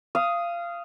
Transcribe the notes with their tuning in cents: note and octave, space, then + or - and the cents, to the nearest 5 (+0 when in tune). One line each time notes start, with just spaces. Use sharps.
F5 -20 D#6 +5